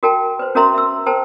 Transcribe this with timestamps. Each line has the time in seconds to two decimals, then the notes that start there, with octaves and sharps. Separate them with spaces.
0.03 F#4 A#4 G5 A5
0.39 B4 C5
0.55 C#4 F#4 A#4 E5 A#5 C6
0.74 E5 E6
1.06 A#4 C5 G5 A5 A#5